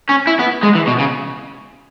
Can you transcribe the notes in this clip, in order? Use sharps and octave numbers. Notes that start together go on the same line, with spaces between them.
C#4
E4
B3
G#3
E3
B2
C#3